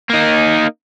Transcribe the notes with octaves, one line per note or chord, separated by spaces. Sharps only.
A#3 D#4